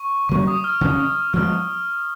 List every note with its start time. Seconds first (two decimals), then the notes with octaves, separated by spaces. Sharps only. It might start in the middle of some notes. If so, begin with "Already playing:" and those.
Already playing: C#6
0.29 C#3 F#3 A#3 C#4 C#6
0.47 D#6
0.64 F6
0.81 C#3 F#3 C#4
1.33 F3 G#3 B3 F6